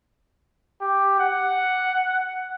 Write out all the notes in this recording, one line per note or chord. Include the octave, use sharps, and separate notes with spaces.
G4
F#5